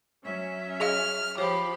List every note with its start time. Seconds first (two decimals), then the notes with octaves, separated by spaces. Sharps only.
0.25 F#3 C#4 E5
0.80 G#4 D#5 F5 F6
1.38 F3 G4 C#5 F5 B5